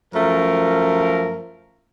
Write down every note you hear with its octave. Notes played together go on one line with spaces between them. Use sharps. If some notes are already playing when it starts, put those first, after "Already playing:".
F#2 F3 A3 A#4